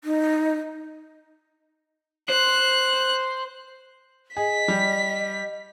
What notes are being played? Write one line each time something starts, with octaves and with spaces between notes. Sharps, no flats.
D#4
C5 F#6
G#4 D#5 B6
G3